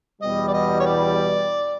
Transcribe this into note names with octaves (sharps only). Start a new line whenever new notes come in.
E2 B2 G3 D#5
D5
D#5
C#5
D5